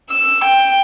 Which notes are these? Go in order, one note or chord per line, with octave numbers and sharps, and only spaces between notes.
E6
G5